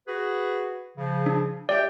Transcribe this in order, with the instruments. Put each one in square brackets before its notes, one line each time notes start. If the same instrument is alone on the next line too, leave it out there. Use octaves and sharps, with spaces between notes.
[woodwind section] F#4 G#4 B4
C#3 F3
[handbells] D4
[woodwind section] G4 E5 G5 [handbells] D5